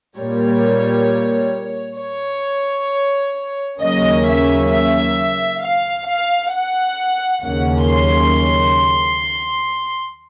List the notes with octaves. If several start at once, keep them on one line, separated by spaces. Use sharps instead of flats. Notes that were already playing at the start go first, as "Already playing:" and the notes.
A#2 G3 A#3 C#5
C#5
D#2 C#3 F#3 A#3 C#4 D#5
E5
E5
F5
F5
F#5
D#2 C#3 F#3 A#3 C#4 F#5
C6